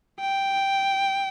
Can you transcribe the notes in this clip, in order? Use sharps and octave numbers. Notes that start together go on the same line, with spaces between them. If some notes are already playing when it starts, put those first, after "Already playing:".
G5